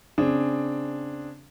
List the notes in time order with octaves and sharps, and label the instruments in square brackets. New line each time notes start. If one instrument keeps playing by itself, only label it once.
[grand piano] C#3 C4 D4 G#4